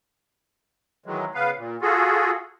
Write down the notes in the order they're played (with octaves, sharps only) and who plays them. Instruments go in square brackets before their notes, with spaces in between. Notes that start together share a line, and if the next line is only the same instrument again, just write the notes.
[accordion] D#3 E3 F#3 G#3
C#3 B3 B4 F5
A#2
F4 F#4 G#4 A4